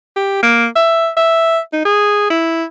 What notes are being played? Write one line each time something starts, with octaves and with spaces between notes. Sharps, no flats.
G4
A#3
E5
E5
D#4
G#4
E4